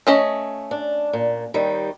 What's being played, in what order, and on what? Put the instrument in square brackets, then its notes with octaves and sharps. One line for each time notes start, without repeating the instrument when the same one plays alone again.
[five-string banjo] A3 C#4 D#5
[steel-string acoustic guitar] D4
A#2
D#2 D#3 G3